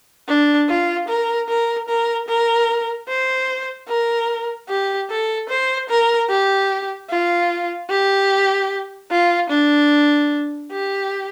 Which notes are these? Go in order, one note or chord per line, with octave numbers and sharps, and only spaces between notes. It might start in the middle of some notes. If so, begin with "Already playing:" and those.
D4
F4
A#4
A#4
A#4
A#4
C5
A#4
G4
A4
C5
A#4
G4
F4
G4
F4
D4
G4